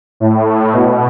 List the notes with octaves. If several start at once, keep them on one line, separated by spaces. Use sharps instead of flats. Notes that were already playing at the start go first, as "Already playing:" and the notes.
A2
B2